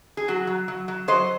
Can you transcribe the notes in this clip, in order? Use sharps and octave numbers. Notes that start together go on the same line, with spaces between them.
G#4
F#3 F#4
F#3
F#3
F#3
F#3 C5 D#5